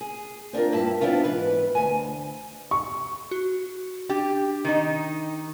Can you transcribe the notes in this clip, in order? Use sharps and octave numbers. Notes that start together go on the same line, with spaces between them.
G#4
C4 D4 F4 A#4
G2 A#2 E4 G4 A5
B3 C4 D4 E4 F4 A#4
G#2 E3 B4
D2 G#5
C#6
F#4
D4 G4
D#3 D#4